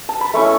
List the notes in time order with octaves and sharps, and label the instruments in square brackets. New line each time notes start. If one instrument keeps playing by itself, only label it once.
[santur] A5
B5
A3 C#4 E4 C#6